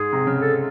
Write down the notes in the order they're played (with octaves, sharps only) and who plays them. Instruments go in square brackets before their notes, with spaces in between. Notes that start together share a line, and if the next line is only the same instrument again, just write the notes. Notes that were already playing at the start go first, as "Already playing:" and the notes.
Already playing: [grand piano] G#2 [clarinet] G#4
[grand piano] C3
C#3
[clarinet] A4